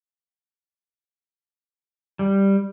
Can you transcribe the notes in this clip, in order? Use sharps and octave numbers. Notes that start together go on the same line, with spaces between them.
G3